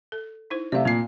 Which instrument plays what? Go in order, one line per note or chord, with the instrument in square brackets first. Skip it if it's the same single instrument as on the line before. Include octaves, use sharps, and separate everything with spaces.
[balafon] A4
D#4 E4 C5
[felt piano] C3 A3 [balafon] D5 F5
[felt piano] A#2 C7 [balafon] C4